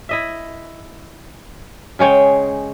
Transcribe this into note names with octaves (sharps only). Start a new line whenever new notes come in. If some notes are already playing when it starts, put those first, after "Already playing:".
E4 D#5 E5
C#3 G#3 C#5 G5